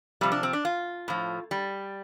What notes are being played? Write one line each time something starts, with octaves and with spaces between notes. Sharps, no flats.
C3 F3 G3
D4
C4
D4
F4
A2 F3
G3